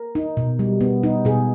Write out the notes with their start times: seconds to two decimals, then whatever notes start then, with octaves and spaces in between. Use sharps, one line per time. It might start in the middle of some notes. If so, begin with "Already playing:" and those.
Already playing: A#4
0.15 D#4
0.37 B2
0.59 G3
0.81 B3
1.03 D#4
1.25 B2 G#4